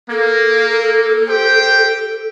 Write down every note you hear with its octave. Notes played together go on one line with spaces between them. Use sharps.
A#3 A4
G4 C5 G5